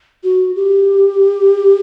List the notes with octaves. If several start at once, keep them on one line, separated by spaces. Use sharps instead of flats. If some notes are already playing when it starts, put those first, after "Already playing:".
F#4
G4